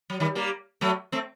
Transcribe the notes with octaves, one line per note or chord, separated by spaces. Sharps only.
F#3
D#3 G3
G3 A#3
F#3 A3
A3 C4